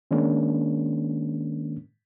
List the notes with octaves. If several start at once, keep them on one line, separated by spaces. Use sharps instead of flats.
D#3 G#3 A#3 C#4 D4